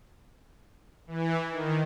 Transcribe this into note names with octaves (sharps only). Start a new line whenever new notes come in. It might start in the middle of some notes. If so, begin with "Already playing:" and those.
E3
D#3